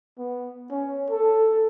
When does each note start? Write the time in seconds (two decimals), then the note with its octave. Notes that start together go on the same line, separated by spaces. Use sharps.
0.18 B3
0.71 C#4
1.10 A4